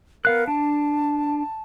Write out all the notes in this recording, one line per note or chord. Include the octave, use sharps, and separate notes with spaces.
B3 A#4 F5 F#6
D4 A5